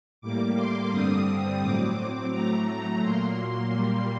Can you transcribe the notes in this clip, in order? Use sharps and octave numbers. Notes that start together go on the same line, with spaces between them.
A2 G3 A#3 D6
C6
G2 D3 G3 C4 D#6
A2 F#3 C4 D6
A2 F#3 A3 A#5
A#5
A#2 F#3 A#3 C6
C6
A#2 G3 A#3